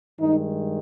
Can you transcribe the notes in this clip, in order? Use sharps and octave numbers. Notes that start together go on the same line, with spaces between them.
G2 D#3 G#3 D#4